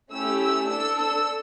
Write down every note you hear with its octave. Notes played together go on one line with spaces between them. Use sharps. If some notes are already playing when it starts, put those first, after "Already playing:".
A3 C#4 E4 G4 E6
E6
D4 A4 E6
E6